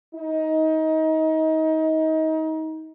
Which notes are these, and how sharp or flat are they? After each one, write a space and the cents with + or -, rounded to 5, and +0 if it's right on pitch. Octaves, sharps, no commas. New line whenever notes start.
D#4 +25